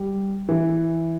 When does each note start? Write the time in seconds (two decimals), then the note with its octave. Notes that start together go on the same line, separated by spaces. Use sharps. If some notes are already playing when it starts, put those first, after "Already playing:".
Already playing: G3
0.49 E3